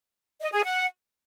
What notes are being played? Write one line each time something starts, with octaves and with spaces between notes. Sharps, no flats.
D#5
G#4
F#5